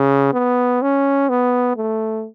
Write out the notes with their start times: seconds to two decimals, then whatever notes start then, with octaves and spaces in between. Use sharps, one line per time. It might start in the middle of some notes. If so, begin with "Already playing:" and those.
Already playing: C#3
0.33 B3
0.82 C#4
1.29 B3
1.76 A3